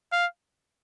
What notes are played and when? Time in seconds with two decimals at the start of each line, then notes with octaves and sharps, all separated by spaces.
0.12 F5